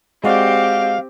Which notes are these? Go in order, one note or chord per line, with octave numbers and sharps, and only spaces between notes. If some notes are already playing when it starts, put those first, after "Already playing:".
G#3 C4 F#4 G4 D5 F5